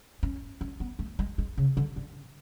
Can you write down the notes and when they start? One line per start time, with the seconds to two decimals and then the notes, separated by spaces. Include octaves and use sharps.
0.23 C#4
0.61 C#4
0.80 B3
0.99 A3
1.19 G#3
1.38 G#3
1.57 C#3
1.77 D3
1.96 D3